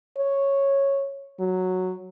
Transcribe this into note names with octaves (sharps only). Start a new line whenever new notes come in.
C#5
F#3